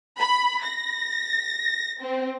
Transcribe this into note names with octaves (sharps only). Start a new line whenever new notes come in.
B5
A#6
C4